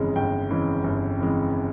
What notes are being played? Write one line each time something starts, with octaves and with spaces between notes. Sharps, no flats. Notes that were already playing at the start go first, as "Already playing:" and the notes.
Already playing: G1 F2 C#3 E3 G#3
G1 G5
F2 C#3 E3 G#3
G1
F2 C#3 E3 G#3